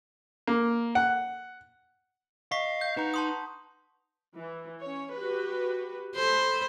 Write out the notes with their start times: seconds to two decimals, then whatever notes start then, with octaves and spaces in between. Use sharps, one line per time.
0.47 A#3
0.95 F#5
2.52 D#5 F5 C#6 B6
2.81 G6
2.97 D#4 B4 F#5 A#5
3.14 A5 C6 D#6
4.36 E3
4.81 C#4 C#5
5.15 F#4 G4 B4
6.16 A4 C5 B5